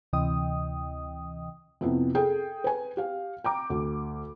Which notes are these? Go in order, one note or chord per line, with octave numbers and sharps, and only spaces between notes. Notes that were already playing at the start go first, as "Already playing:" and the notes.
D2 C3 E3 D#5 G5 D#6
F2 C3 B3 E4
G#4 A4 G5
B4 G#5
G4 F5
G5 A#5 D6
D2